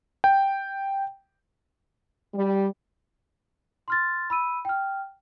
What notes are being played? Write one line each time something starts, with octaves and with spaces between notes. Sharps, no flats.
G5
G3
C6 F6 A6
B5 E6 D#7
G5 F6